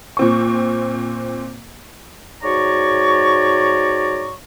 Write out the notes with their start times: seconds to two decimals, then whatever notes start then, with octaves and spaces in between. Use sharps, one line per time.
0.17 A#2 C4 C#6
2.44 G#2 F#4 C#5 D5 A#5 C#6